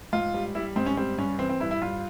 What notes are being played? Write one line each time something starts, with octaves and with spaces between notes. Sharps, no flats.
G#2 F4
G3
G3 E4
G#2 C4
C#4
G3 C4
G2 C#4
E3 C4
C4
G2 E4
E4
G2 F4